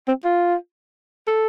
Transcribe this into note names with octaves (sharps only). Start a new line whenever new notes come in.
C4
F4
A4